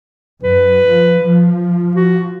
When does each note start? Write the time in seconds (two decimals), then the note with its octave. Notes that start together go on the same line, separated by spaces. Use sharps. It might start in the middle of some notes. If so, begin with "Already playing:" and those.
0.43 F#2 B4
0.87 F3
1.19 F3
1.96 F#4